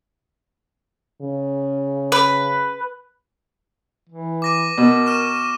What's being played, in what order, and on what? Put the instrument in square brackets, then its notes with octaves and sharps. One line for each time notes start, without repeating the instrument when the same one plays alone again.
[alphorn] C#3
[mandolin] B4
[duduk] E3
[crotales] D6 A#6 D#7
[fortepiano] B2 [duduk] A#4
[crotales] C#6 F6 E7